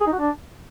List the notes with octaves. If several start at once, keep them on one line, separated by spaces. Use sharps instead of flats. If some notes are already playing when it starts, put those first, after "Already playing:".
G#4
D#4
F#4
D4